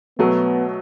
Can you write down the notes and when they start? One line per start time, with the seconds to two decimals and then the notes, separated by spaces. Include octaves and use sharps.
0.19 B2 F#3 A3 B3